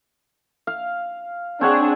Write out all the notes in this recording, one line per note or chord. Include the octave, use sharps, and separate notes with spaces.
F5
C4 D4 G#4 C#5 F#5